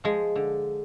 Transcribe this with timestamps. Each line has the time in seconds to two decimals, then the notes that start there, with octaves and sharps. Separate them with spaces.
0.04 F3 G#3
0.35 D3